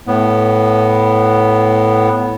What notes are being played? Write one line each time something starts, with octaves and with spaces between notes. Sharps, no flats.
A2 B3